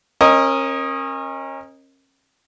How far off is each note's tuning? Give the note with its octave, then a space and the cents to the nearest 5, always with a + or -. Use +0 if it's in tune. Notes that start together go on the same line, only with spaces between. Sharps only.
C#4 -35 A#4 +0 D#5 +0